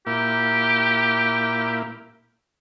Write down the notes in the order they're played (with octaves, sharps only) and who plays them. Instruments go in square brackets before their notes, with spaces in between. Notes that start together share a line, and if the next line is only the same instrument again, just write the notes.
[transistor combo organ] A#2 A#3 E4 [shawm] G4